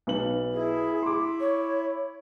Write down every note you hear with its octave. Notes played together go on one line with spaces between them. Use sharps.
B1 B3 F#7
E4 G#4
C6 D6
C#5